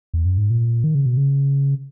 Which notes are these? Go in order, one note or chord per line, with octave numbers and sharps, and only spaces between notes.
E2
F#2
G#2
A#2
D#3
C#3
B2
C#3